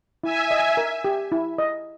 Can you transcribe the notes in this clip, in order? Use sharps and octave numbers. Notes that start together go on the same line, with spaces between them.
E4 E5 G#5
D#5
A#4
G4
E4
D#5